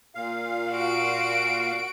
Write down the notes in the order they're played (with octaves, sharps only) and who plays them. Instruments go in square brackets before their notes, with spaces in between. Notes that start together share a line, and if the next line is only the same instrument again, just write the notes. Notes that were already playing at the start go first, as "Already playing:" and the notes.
[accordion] A#2 F5
[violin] F#4 D7